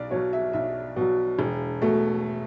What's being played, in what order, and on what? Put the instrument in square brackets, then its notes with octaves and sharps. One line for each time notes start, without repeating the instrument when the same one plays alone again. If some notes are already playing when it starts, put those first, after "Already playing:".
Already playing: [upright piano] B1 D5
B2 F#3 C#5
E5
B1 E5
B2 F#3
E1
B2 A3